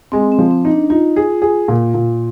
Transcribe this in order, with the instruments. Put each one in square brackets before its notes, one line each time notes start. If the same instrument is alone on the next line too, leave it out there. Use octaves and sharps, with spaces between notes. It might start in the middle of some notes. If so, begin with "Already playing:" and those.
[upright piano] G#3 [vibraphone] C4
[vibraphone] C4
[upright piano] F3
[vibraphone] C4
[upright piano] D#4
[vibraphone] D4
[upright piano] D#4 [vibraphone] F4
[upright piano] G#4
G#4
A#2
A#2